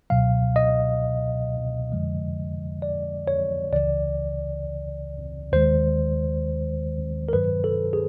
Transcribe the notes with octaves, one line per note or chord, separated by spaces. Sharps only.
C#2 B2 F#3 F5
D#5
F2 D3 F3 G#3
D5
C#5
C#2 C#3 E3 D5
D#2 D#3 G#3 C5
A#4
G2 D#3 F#3 B4
A4
G#4